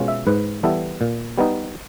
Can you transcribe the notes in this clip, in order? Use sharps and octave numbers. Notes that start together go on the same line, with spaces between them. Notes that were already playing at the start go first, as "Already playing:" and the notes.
Already playing: B2 G#3 C#4 F4
E5
G#2 B4
E3 G3 B3 E4 A4
A#2
G3 B3 D#4